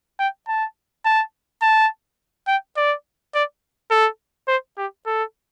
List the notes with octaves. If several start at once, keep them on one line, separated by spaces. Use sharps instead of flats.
G5
A5
A5
A5
G5
D5
D5
A4
C5
G4
A4